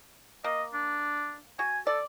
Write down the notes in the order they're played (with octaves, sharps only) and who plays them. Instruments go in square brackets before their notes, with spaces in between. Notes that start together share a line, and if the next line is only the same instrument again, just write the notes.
[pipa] A#3 [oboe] D#5
[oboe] D4
[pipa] F#4 [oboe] G#5
[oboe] A4 [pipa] D5